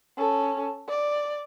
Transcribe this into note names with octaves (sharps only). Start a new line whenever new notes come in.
C#4 A4
D5